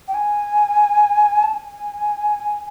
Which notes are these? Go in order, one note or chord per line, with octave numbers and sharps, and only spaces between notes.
G5
G#5
A5
G#5